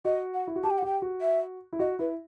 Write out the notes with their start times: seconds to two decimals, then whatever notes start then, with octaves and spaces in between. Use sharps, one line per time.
0.05 F#4 D#5
0.34 F#5
0.47 E4
0.56 F#4
0.63 G4 A5
0.70 G5
0.78 F#5
0.82 G4 G5
1.02 F#4
1.21 E5
1.73 E4
1.79 F#4 D#5
1.99 E4 B4